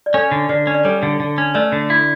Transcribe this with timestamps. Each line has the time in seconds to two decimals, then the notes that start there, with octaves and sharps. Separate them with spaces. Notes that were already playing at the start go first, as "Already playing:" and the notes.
0.06 D5
0.14 C#4 A4 C#5
0.31 D3
0.49 D3 B4 D5
0.67 C#4
0.74 D5
0.84 G3 A4 C#5
1.03 D3
1.20 D3
1.38 C#4
1.54 A3 B4 D5
1.72 D3
1.90 E4